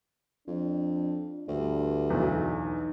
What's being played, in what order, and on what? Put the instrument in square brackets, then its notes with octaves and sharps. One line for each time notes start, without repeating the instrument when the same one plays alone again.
[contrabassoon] F2 [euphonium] D4
[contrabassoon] D2 [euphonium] G2
[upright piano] B1 E2 [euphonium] D#4